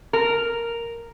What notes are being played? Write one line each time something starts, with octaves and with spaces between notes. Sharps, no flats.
A#4